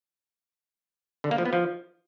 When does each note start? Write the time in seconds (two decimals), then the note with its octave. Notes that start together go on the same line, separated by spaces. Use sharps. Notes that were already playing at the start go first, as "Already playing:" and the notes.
1.24 D3
1.31 A#3
1.38 F3
1.45 B3
1.53 F3